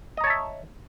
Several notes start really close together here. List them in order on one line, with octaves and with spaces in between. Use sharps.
D#5 A#5 C#5 A5 E5